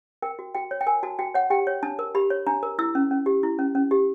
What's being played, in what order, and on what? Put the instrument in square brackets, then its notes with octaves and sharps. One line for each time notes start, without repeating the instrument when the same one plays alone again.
[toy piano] A#4 G5
F#4
F#4 G5
C#5
G5
A#4 G#5
F#4 A5
F#4 G5
C#5 F#5
G4 G5
C#5
D4 A5
A#4
G4 B5
C#5
D4 A#5
A#4
E4 E6
C#4
C#4
G4
E4
C#4
C#4
G4